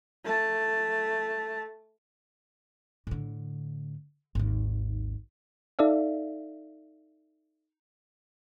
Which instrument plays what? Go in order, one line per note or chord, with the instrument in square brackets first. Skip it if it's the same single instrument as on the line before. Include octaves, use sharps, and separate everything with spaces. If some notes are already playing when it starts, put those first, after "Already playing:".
[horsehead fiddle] A3 A5
[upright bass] A2 D3
G#1 D#2
[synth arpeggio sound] D#4 A4 D5 E5 F5